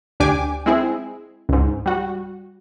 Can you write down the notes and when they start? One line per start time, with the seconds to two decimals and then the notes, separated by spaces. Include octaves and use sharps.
0.20 D2 D4 G4 G#5 D6
0.66 G#3 C4 E4 G#4
1.49 C#2 G#2
1.86 G3 F#4